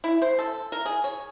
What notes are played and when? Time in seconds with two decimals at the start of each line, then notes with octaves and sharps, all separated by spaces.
0.04 E4
0.22 C5
0.39 A4
0.72 A#4
0.85 G#4
1.04 C#5